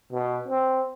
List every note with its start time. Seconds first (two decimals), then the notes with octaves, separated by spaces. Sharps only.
0.12 B2
0.48 C4